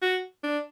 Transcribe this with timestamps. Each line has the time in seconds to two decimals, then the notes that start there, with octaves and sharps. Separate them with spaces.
0.02 F#4
0.43 D4